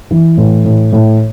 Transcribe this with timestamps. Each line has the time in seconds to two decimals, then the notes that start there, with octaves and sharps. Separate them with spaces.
0.11 E3
0.37 A2
0.65 A2
0.92 A2